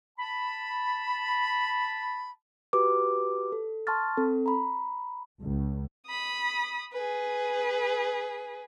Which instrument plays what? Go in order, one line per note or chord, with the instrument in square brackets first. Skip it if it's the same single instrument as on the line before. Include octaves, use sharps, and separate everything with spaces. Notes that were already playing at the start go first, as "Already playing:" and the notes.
[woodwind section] A5 B5
[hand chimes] F#4 G4 B4 D6
A4
A5 C6 C#6 F6 A6
C4 A4
A#5 B5
[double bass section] C#2
[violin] B5 D#6
G#4 B4